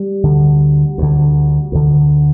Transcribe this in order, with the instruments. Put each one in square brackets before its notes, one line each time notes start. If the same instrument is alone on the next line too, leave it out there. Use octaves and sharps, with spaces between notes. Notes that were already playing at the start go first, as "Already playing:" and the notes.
Already playing: [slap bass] G3
D2 D3
D2 D3
D2 D3